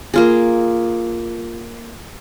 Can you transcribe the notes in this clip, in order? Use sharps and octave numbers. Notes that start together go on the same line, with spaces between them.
A#3 F4 G#4